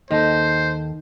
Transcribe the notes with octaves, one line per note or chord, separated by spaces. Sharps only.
D#2 D#3 A4 C5